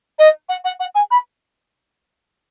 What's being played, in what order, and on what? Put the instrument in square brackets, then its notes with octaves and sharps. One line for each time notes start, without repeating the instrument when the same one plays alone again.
[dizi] D#5
F#5
F#5
F#5
G#5
B5